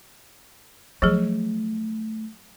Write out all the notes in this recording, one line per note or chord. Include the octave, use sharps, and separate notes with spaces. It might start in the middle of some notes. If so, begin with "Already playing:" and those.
F3 F#3 A3 G#4